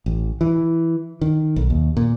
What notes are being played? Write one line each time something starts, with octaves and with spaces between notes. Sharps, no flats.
A1
E3
D#3
B1
D#2
A#2